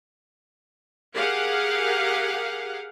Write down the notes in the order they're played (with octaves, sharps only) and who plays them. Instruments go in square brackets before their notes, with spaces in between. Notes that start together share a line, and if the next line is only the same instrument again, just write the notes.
[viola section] G4 G#4 A#4 F5 F#5